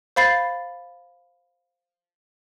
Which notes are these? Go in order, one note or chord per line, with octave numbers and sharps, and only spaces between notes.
C5 F5 B5 A6 C7